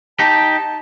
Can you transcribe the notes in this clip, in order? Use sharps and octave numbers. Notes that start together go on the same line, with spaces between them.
D#4 G4 A5